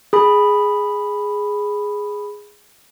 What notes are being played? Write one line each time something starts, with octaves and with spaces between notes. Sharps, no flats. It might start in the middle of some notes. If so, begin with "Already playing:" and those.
G#4 B5